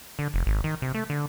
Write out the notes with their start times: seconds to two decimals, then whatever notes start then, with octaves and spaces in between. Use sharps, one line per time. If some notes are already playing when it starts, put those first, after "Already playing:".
0.19 D3
0.34 F1
0.46 G#1
0.64 D#3
0.82 C3
0.95 A3
1.10 D3